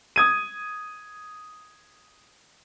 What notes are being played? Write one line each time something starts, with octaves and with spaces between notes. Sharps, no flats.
D#6 G#6 D#7